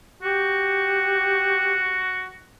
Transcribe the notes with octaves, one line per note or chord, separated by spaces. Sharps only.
F#4 G4